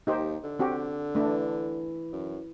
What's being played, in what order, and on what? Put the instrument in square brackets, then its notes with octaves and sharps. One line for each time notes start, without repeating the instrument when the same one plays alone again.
[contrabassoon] D#2 [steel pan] D#4 G4 C5
[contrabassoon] D3
[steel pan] C4 F#4 G4
[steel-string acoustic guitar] E3 [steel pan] A3 D4
[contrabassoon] F#2